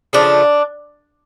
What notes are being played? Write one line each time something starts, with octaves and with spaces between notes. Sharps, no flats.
C#3 F3 A3 D4